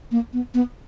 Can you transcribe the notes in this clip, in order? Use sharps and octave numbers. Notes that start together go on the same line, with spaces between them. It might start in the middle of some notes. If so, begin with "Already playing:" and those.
A#3
B3
B3